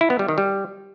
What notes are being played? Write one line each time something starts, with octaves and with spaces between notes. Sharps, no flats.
E4
B3
G3
D#3
G3